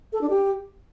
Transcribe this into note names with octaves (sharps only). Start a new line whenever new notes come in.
A4
D4
G4